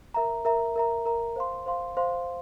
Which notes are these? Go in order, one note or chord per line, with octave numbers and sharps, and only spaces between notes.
A#4 E5 A#5
A#4 E5 A#5
A#4 E5 A#5
A#4 E5 A#5
C5 F5 C6
C5 F5 C6
C5 F5 C6